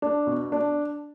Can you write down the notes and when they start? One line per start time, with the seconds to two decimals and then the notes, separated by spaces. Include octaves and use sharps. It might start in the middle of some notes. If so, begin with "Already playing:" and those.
0.02 D4
0.27 B2
0.52 D4